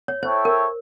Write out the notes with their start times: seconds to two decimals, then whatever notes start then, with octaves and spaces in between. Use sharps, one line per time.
0.08 C#5
0.23 E4 A4 C5 C#5 E5 G5
0.45 A#4